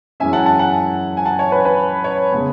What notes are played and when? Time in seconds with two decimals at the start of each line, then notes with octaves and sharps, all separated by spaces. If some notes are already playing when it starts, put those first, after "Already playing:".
0.20 F#2 E3 G#3 C#4 E5 G#5
0.33 F#5 A5
0.46 F#5 A5
0.59 F#5 A5
1.17 G#5
1.25 F#5 A5
1.39 C#5
1.52 B4
1.65 B4
2.04 C#5
2.32 C#3 G#3 B3